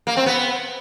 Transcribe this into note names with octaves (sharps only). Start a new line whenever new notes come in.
A#3
C4
B3